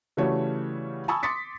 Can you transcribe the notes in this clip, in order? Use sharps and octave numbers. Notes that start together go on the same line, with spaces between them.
C#3 E3 G3 A3 F#4 C#5
G#5 A5 B5 C#6 D#6 E6
C6 D6 D#6 A6 B6 C#7